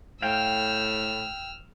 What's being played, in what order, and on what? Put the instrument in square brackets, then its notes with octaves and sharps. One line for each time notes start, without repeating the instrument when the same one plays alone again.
[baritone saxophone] A2 [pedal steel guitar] F5 G5 [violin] E6 F6